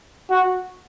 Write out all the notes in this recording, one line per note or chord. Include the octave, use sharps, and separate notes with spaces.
F#4